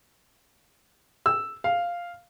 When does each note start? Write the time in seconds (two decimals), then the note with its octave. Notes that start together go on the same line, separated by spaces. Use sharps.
1.26 E6
1.64 F5